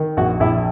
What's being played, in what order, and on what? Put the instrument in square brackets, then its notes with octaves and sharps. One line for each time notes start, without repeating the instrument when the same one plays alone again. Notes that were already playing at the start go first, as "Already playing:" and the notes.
Already playing: [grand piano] D#3
[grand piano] A#1 [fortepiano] F#4
[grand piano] A#1 [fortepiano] E4